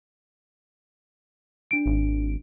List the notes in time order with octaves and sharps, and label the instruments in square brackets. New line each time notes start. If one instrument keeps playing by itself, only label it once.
[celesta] D4 D7
[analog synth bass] G#1